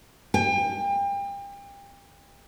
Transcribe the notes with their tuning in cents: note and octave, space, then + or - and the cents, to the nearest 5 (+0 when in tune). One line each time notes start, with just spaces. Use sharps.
G5 +35